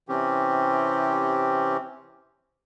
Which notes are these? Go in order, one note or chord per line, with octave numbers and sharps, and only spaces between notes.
C3 E3 C4 C#4 G4